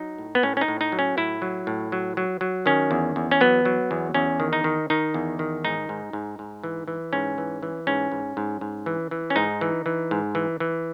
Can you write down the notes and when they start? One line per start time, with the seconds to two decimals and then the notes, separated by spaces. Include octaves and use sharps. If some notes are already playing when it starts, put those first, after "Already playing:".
Already playing: F#3 D#4
0.18 A2
0.35 B3
0.43 A2 C#4
0.57 C#4
0.61 D#4
0.68 A2
0.81 D#4
0.92 F#3
0.99 C#4
1.17 A2 E4
1.42 F#3
1.67 A2
1.92 F#3
2.17 F#3
2.41 F#3
2.66 D#3 C#4
2.91 E2
3.16 E2
3.31 C#4
3.41 F#3 B3
3.65 F#3
3.91 E2
4.14 E2 C#4
4.40 D#3
4.53 D#4
4.64 D#3
4.90 D#3 D#4
5.14 E2
5.39 D#3
5.64 G#2 D#4
5.89 G#2
6.13 G#2
6.39 G#2
6.63 E3
6.88 E3
7.13 G#2 C#4
7.38 E3
7.63 E3
7.87 G#2 C#4
8.12 G#2
8.37 G#2
8.61 G#2
8.86 E3
9.11 E3
9.30 C#4
9.36 G#2 D#4
9.61 E3
9.86 E3
10.11 G#2
10.35 E3
10.60 E3